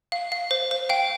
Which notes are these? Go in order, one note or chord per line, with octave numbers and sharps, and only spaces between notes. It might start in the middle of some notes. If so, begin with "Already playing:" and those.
F5
F5
C5
C5
F5 G5